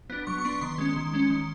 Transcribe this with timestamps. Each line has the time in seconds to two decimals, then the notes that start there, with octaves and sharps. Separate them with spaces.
0.10 B3 D4
0.27 F#3 C#6
0.38 C#6
0.44 B3 D4 C6
0.50 C#6
0.61 D#3 C6
0.78 G#3 C#4
0.96 D#3
1.13 G#3 C#4
1.30 D#3